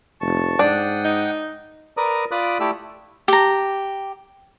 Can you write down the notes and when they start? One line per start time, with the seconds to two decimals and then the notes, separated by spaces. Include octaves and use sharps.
0.21 F1 A5 C#6
0.59 G#2 D4 F#5 G5 D#6
1.04 D#4
1.97 A#4 B4 D5 A#5 D#6
2.31 F4 D5 B5 D6 D#6 F#6
2.60 A3 E4 G4 A4 D5 E6
3.28 G4 A#5